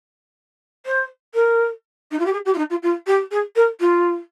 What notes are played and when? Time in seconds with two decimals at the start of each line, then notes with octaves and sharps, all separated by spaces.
0.86 C5
1.34 A#4
2.11 D#4
2.19 F4
2.26 G4
2.33 G#4
2.45 G4
2.54 F4
2.58 D#4
2.70 F4
2.83 F4
3.07 G4
3.31 G#4
3.56 A#4
3.80 F4